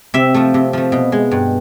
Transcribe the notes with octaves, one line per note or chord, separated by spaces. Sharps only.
C3 E5
F3 A3
C3
F3 A3
B2
G#3
G2